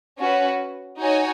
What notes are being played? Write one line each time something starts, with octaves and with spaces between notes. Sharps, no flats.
C#4 F#4 B4
D#4 F#4 C#5 G#5